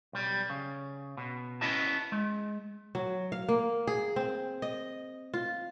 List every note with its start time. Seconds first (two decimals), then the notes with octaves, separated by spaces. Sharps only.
0.13 B1 G3
0.50 C#3
1.17 B2
1.61 B3 C#4 E4 D#5 A5
2.12 G#3
2.95 F#3
3.32 F5
3.48 A#3
3.87 G#4
4.16 C4
4.62 D#5
5.34 F4